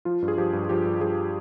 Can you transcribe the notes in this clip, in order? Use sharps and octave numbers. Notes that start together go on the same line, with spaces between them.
F3 F4
G2
G#4
F3 G4
G2
F3 G4
G2
F3 G#4